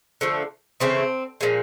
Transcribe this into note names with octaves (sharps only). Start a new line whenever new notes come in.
D3 F3 A3
C#3 E3 A3 C4
A#2 F3 G#3